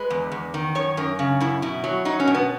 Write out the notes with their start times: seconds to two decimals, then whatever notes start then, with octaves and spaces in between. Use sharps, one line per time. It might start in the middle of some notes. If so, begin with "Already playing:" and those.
Already playing: G#3 B4
0.10 E2
0.32 E2
0.54 D#3
0.75 F#2 C#5
0.97 F#2 A#4
1.19 C#3
1.41 F#2 E4
1.62 B2 E4
1.84 F#3
2.05 F#3 D#4
2.20 C#4
2.27 B2
2.34 B3